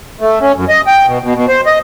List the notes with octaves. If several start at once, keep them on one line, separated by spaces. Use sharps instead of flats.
A3
C#4
F#2
D#5
G5
B2
B2
B2
C5
D#5